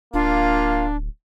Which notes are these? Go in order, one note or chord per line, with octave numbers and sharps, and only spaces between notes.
D1 A#3 D4 F4